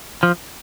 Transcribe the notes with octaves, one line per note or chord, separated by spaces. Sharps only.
F3